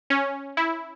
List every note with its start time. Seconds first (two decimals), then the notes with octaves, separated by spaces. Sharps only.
0.10 C#4
0.57 E4